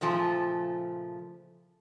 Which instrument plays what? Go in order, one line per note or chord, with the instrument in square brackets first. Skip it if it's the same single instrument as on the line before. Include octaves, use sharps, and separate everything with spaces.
[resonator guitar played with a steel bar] A#2 C#3 F3 A3